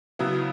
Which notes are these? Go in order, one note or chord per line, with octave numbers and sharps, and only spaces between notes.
C#3 F#3 B3 E4